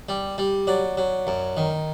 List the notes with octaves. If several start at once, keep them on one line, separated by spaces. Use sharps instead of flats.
G3
G3
F#3 D5
F#3
F#2
D#3